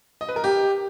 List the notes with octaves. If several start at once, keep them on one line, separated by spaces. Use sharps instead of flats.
D#5
B4
A#4
G4